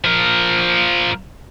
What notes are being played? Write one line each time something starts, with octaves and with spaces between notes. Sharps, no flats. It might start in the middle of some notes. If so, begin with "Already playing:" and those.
F3 A#4